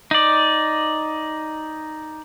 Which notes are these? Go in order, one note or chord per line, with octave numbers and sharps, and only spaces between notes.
D#4 D5